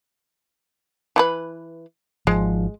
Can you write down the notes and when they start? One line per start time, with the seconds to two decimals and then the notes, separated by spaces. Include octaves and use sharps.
1.16 E3 E4 B4
2.27 G#1 F3 G#3